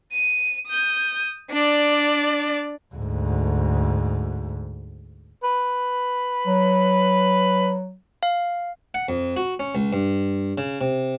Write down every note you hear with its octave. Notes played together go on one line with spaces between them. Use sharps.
D#7
D#6 G6
D4 D5
D2 G#2
B4
F#3
F5
F#5
F2
F#4
C#4
C#2
G2
C#3
C3